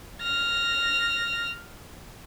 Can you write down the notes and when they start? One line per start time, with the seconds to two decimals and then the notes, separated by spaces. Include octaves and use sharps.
0.22 F6 A#6